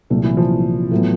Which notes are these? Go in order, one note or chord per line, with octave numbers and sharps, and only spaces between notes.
C2 A#2 F#3 A3
E3
F3
A2 F#3 B3